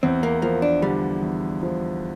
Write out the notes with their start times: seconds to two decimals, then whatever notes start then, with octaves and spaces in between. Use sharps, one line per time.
0.03 E2 C4
0.23 A#3
0.42 F3 A#3
0.62 D4
0.82 D3 G3
1.22 E2
1.63 F3